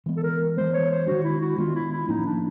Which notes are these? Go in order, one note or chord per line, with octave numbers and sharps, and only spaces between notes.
E3 G#3 B3
A4
A#4
E3 G#3 B3 C5
C#5
C5
D#3 G#3 B3 D4 F#4
E4
F#4
D#3 G#3 B3 D4 F4
E4
E4
A2 F3 A#3 C#4 D#4
D4